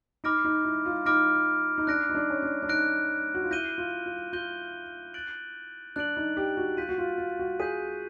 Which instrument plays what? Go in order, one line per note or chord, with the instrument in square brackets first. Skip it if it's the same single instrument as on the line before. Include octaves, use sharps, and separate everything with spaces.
[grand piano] D#4 [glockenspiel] B5 D6 F6 A#6 D7
[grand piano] D#4
E4
F4
[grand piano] D#4 [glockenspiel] B5 D6 F6 A#6 D7
[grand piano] D#4
[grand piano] D4 [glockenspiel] F#6 A#6 D7
[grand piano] D#4
D4
C#4
D4
D4
[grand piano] D#4 [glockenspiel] F#6 A#6 D7
[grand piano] F#4
F4
[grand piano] E4 [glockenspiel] G6 A#6 D#7 G7
[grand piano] F4
F4
[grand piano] F4 [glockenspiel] G6 A#6 D#7 G7
[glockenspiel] F#6 A6 D7 F#7
[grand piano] D4 [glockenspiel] F#6 A6 D7 F#7
[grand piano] D#4
G4
F#4
[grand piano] F4 [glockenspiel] G6 B6 D#7
[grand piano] F#4
F4
F4
F#4
[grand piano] G#4 [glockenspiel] G6 B6 D#7